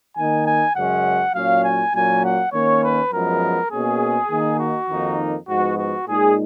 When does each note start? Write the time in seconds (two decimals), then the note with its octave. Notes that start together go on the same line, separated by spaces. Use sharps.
0.17 D#3 A#3 D#4 G#5
0.46 G#5
0.76 F#2 C#3 G#3 C#4 F#5
1.34 A#2 F#3 C#4 F5
1.64 G#5
1.94 A#2 F#3 A#3 C#4 G#5
2.24 F#5
2.53 D#3 A#3 C#4 C#5
2.83 B4
3.12 F#2 F3 G#3 B3 A#4
3.71 B2 A#3 C#4 G#4
4.30 D#3 A#3 D#4
4.60 F#4
4.89 F2 D#3 A#3 D#4
5.48 G#2 F3 B3 F#4
5.77 F#4
6.06 A#2 G#3 D#4 G#4